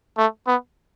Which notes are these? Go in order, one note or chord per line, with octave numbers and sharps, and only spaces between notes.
A3
B3